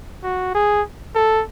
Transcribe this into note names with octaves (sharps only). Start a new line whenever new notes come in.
F#4
G#4
A4